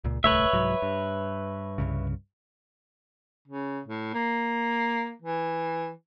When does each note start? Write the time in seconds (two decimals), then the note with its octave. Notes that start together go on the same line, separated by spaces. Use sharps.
0.04 C#2 A#2
0.24 D1 C2 A3 B4 C#5 E5
0.53 C2 G#2 F#3
0.82 G2
1.78 C2 G2 C#3
3.48 C#3
3.87 A2
4.14 A#3
5.22 E3